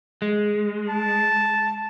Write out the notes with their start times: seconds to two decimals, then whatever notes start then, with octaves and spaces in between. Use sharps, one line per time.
0.22 G#3
0.89 A5